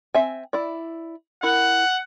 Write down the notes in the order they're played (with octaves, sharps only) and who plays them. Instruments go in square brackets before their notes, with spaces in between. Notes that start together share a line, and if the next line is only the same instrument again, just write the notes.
[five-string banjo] C4 E5 G#5
E4 D5
[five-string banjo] E4 A#4 [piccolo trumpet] F#5